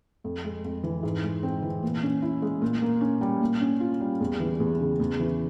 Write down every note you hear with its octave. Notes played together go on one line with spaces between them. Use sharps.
F2
G#3
F2
E3
G#2
G#3
C4
E3
A#2
C#4
E4
G#3
A#2
A#3
C#4
G3
A#2
C#4
F4
G3
E2
E3
E2
C#3
E2
E3